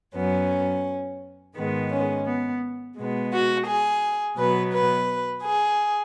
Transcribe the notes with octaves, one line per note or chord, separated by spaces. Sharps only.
F#2 F#3 B3 C#4
G#2 D#3 G#3 B3
C#4
B3
B2 G#3 B3
F#4
G#4
B2 F#3 B3 B4
B4
G#4